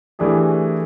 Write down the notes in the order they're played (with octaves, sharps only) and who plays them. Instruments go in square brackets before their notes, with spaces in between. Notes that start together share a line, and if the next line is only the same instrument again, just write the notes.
[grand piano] E3 A3 D4 G4 G#4